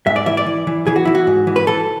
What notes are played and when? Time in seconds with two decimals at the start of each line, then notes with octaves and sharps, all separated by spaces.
0.07 G#2 E5
0.16 D5
0.26 E3 E5
0.37 D5
0.47 E3
0.67 E3
0.87 E3 G#4
0.96 F#4
1.05 E3 E4
1.15 F#4
1.27 G#2
1.47 E3
1.56 B4
1.67 E3 A4